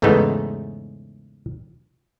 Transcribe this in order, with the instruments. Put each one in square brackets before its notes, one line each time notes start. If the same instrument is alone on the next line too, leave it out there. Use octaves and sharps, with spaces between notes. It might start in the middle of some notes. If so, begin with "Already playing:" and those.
[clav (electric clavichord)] E2 G#2 C#3 A3 B3 D#4